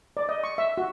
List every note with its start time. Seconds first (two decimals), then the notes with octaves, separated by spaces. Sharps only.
0.17 D5
0.29 D#5
0.44 C#6
0.58 E5
0.78 F#4